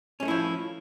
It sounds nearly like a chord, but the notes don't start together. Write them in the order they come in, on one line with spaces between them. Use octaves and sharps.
C#4 G#3 A3 E4 F3